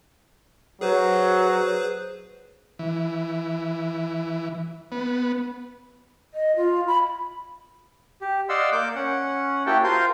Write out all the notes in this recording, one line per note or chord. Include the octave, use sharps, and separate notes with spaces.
F#3 G#4 B4 C5
E3
B3
D#5
F4
B5
G4
D5 D#5 F5 F#5 C6 E6
A#3 D6 G6
C#4 F#5
A#3 E4 F#4 G4 G5 A5
F4 A#4 C5 F5 C6 G6